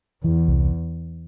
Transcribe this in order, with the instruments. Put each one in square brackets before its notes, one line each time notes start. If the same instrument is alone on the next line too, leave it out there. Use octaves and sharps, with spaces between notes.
[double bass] E2 [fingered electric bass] E3
[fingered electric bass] C2